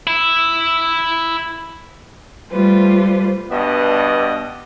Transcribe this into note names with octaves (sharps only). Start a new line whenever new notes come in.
E4
G3 A3 F4 B4 C5
G2 B2 B3 D5 D#5